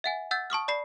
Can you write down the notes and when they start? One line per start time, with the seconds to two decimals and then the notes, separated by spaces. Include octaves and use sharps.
0.04 E5 F#5 G#5
0.31 F#5 E6 G6 A6
0.50 A5 C#6 D#6 F6
0.68 D5 B5 C7